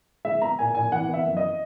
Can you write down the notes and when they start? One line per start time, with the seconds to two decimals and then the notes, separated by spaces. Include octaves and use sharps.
0.25 G#3 E5
0.42 B3 A#5
0.59 A#2 G#5
0.75 A#2 G#5
0.92 E3 F#5
1.09 B3 E5
1.25 F#2
1.37 D#5